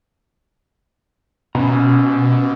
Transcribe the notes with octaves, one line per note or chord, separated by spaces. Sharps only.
B2 C#4 A#5